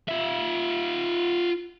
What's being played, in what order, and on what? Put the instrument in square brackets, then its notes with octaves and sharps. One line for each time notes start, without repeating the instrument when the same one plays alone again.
[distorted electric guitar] F4 E5